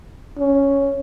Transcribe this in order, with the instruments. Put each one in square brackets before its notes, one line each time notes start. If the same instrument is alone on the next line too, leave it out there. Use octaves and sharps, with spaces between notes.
[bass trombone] C#4